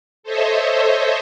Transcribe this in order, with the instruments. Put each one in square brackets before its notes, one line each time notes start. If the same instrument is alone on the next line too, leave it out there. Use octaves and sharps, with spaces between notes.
[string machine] A4 C5 C#5 D#5 E5